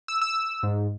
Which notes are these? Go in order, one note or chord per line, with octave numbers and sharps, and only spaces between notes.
E6
E6
G#2